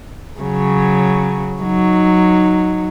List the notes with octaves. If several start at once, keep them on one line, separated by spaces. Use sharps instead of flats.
C#3 F#3
F#3 D#4